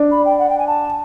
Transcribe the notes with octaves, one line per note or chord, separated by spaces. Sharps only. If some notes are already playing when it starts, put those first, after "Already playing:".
Already playing: D4
B5
G5
F#5
G5
G#5
A5